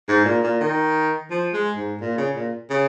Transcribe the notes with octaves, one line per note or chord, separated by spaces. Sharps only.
G#2
A#2
A#2
D#3
F3
G#3
G#2
A#2
C#3
A#2
C#3